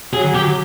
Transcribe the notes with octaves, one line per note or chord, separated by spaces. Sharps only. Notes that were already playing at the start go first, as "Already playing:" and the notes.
F#3 G#4
G4